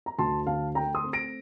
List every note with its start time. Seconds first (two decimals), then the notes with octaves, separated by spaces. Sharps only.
0.06 A#5
0.19 D2 A5 C6
0.47 D3 F5 A5
0.75 A3 G5 A#5
0.94 C6 D#6
1.04 C4
1.13 A#6 D7